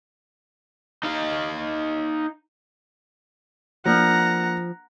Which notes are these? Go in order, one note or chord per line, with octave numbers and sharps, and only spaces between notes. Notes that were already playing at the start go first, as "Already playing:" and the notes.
D#4 F5
F3 A#3 D4 F#5 A#5